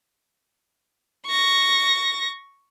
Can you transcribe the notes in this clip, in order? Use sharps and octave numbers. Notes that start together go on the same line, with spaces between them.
C#6 A#6